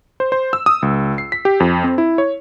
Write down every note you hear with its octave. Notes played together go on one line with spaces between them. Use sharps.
C5
C5
E6
D#6
C#2
C7
B6
G4
F2
C4
E4
C#5